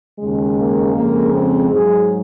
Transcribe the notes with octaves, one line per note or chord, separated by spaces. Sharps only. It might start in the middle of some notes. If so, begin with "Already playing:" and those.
D#2 C#3 G#3
A#3
F2 C#3 G#3 A#3
C4
G#2 F#3 G#4